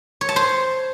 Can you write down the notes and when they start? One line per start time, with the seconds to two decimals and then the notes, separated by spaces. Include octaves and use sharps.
0.21 C#5
0.29 A5
0.36 C5